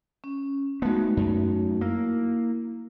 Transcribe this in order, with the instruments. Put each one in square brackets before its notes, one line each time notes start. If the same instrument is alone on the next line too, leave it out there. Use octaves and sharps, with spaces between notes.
[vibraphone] C#4
[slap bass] G#3 B3 [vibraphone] A3 D#4 F#4
[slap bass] F#2
[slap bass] A#3 [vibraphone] E4